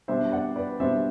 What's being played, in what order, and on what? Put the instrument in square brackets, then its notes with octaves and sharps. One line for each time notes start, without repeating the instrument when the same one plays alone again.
[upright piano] B2 G3 D4 C5 E5
D5 F#5
B4 D5
B2 G3 D4 C5 E5